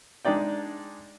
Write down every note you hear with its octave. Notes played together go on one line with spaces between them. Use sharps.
G#3 D4 D#4 D5 G5